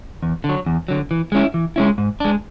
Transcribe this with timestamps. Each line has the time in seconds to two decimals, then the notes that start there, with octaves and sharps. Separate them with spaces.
0.23 E2
0.44 D3
0.49 F#3
0.66 E2
0.88 D3 F#3
1.11 E3
1.32 G#3 C#4 E4
1.54 E3
1.76 G#3 C#4 E4
1.98 G#2
2.20 G#3 D4